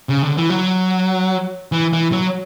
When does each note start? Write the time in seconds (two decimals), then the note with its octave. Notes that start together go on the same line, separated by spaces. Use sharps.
0.09 C#3
0.23 D3
0.36 E3
0.50 F#3
1.72 E3
1.93 E3
2.12 F#3